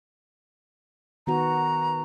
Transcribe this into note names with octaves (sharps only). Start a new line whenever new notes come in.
D#3 B3 F#4 A#5